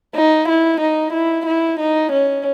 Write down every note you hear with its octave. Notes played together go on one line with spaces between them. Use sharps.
D#4
E4
D#4
E4
E4
D#4
C#4